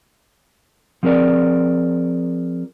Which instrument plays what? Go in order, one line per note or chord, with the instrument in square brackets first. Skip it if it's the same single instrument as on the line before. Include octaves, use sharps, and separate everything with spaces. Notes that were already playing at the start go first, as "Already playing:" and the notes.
[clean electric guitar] F3 C4 G#4 A#4 D5